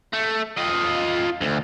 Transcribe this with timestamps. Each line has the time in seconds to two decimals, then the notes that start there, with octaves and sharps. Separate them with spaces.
0.13 A3
0.57 F4 D#5
1.41 D2